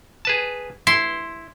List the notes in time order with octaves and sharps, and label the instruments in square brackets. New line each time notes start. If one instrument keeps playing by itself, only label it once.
[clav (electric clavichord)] G#4 B4 A5
[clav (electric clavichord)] E4 [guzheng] C6